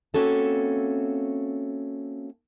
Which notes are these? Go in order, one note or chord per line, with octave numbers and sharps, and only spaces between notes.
A#3 C4 C#4 F#4 A4 E5